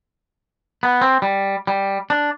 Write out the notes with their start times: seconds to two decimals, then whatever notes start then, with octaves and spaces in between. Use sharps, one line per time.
0.83 B3
1.01 C4
1.22 G3
1.67 G3
2.10 D4